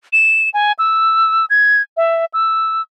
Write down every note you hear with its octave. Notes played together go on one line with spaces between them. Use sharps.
E7
G#5
E6
G#6
E5
E6